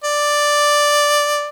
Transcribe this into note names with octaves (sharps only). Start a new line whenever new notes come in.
D5